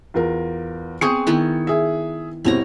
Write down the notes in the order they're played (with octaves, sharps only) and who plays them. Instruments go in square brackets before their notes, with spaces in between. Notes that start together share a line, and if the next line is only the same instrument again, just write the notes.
[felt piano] E2 F4 A#4
[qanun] B3 C4 G#4 [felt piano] C#6 D#6 C#7
[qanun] D#3 B3 E4
[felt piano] G#4 E5
[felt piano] D#1 B2 C4 [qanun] E4 C#5 A#5